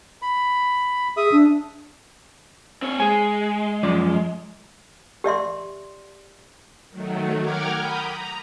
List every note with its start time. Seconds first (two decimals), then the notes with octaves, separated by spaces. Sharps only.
0.22 B5
1.17 G#4 E5 D#6
1.32 D4
2.82 C4 C#5
3.00 G#3 G#4 G#5
3.83 F#2 F3 D5
5.24 G4 D5 E5 C6
6.90 D#3 F#3 A3
7.40 A#4 F#5 G5 D6 F6 G#6
7.76 A#5 B5 D#6 G6
8.08 A#5